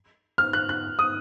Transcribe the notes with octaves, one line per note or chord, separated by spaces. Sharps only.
F6
F#6
F#6
D#6